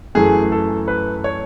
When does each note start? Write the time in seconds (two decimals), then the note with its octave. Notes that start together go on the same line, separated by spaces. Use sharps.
0.15 F#2 E3 A3 G#4
0.52 A4
0.88 B4
1.24 C#5